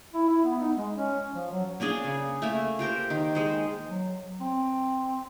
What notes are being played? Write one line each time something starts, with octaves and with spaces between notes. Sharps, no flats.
E4
E4
B3
D#4
G#3
C#4
F3
F#3
A#3 C#4 D4 G#4
C#3
A3 A#3
F4 G4 A#4 C5
D#3
G#3 C5
F#3
C4